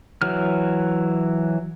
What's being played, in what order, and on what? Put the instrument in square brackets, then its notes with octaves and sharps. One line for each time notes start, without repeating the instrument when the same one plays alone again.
[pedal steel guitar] E3 F#3 F6